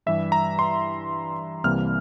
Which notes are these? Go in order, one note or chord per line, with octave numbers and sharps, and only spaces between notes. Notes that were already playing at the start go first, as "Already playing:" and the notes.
G2 E3 G3 E5
A#5
C6
C2 C3 E3 G3 A#3 F6